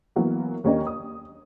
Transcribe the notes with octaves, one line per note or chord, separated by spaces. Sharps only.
E3 F#3 A#3 B3
D#2 A#3 C#4 D4 D#5 G5
D#6